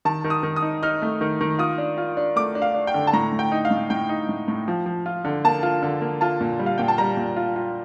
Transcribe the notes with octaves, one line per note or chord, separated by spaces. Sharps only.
D#3 A5
D#3
D#6
D#3
D#6
D#4
D#4 F6
A3
D#3
D#3
F4 D#6
D4
F4
D4
A3 D6
D4
F5
D4
G5
D3
A5
A2 A#5
A2
G5
D#4
F5
A2
A2 G5
D#4
A2
A2
F3
F3
F4
D3
A#3 A5
F4
D3
A#3
F4 A5
A#2
G3
F5
A#2 G5
A5
G3 A#5
A#2
F4
F4